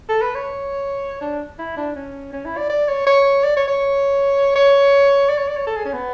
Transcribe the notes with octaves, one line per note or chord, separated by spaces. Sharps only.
A4
B4
C#5
D4
E4
D4
C#4
C#4
E4
D5
D5
C#5
C#5
D5
C#5
C#5
C#5
D5
C#5
D5
C#5
A4
G#4
C#4
B3